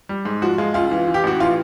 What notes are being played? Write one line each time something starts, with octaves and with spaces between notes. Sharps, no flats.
G3
G#2
F3 F#4
G#3 F4
C#2 F4
E3
E3
G4
A1 F#4
E3 F4